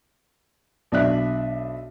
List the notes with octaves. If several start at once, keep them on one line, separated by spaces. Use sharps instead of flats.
B1 D4 E5 F#6